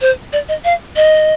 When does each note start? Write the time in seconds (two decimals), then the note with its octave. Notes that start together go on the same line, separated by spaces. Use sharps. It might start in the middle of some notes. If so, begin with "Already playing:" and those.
0.01 C5
0.33 D5
0.49 D#5
0.64 F5
0.96 D#5